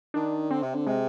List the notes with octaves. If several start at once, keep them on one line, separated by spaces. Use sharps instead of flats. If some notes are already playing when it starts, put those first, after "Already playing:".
D#3 D4
D3 C4
C3
D3
C3 G#3